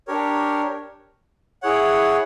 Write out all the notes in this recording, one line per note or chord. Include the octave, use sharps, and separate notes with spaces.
D4 G4 A#4 C#5
E4 G#4 C#5 F#5